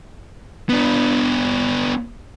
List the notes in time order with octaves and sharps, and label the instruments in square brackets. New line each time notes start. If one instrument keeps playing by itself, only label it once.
[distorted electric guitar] B3 D4